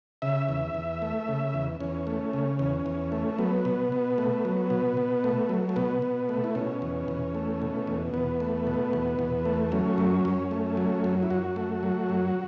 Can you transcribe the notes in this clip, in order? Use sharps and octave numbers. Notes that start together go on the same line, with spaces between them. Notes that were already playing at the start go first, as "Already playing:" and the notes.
C#3 E5
E2
E2
A3
C#3
E2
E2 C#4
A3
C#3
E2 C#4
E2
A3
F#3 B3
B2
B2
A3
F#3
B2
B2
A3
F#3
A3
B2 B3
B2
A3
E4
B2 C#4
E2
E2
A3
B2
E2
E2 B3
A3
B2
E2
E2
A3
F#3 C#4
F#2
F#2
A3
F#3
F#2
E4
F#2 F#4
A3
F#3
F#2